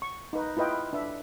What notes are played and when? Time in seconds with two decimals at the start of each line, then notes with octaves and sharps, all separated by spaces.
0.02 C#6
0.33 D#4 B4
0.57 E4 F4 B4 D#5 G5
0.93 D4 B4 E5